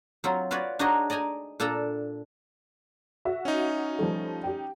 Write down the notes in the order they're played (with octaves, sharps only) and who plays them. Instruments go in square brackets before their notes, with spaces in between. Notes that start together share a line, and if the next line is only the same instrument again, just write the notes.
[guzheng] F#3 C4 F4
F4 F#4 B4 C#5 D5
D4 D#4 F#4 G#4 C#5 D#5
D5 D#5 G5 G#5 A#5
A#2 D4 A4 G5 A5 A#5
[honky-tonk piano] F#4 E5
[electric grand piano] C#4 D#4
[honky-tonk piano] F3 G3 A3
G4 G5